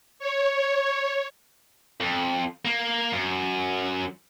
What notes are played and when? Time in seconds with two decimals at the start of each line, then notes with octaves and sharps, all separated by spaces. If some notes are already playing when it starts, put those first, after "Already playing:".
0.19 C#5
2.01 F2
2.65 A#3
3.12 F#2